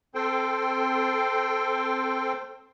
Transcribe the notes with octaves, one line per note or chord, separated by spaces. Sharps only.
C4 A4 C5 G5